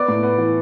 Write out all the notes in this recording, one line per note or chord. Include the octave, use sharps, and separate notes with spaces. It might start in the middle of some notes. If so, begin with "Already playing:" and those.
Already playing: B3 D5 D6
A2
B3
E3